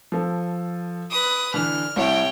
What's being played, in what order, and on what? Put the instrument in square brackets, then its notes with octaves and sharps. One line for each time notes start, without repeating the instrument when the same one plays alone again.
[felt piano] F3 A4
[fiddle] B4 D#6
[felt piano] D3 E3 [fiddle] F6
[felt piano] C2 E4 [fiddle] C#5 G5